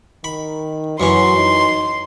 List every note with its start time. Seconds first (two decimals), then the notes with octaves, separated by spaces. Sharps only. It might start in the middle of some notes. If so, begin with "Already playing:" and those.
0.24 D#3 B5
1.00 F#2 E3 F#3 C#4 C6
1.38 D#4